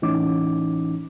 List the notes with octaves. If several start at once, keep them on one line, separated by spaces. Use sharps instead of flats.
A2 E3 C#4 D#4 D6